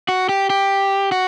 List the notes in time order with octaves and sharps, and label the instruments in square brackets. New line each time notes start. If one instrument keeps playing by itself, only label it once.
[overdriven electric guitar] F#4
G4
G4
F#4